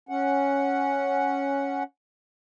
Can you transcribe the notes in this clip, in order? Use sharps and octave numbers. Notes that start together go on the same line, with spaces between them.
C#4 F#5